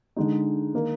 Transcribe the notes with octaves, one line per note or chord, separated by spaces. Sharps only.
D3 G#3 D#4
D#3 A#3 D#4